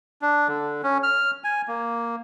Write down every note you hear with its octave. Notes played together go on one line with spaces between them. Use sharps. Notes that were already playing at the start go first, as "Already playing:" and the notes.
D4
D3
C#4
F6
G#5
A#3